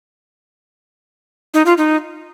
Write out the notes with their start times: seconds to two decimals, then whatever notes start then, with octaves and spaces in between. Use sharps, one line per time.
1.54 D#4
1.66 F4
1.78 D#4